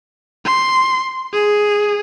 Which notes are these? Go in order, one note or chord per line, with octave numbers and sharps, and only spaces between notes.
C6
G#4